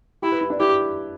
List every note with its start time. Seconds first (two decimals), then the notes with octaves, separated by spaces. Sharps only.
0.22 E4 G4
0.32 B4
0.41 E4
0.50 D4
0.60 E4 G4